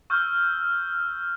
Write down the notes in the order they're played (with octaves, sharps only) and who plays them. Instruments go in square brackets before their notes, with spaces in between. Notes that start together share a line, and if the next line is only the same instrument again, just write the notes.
[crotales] C#6 E6 F6 G6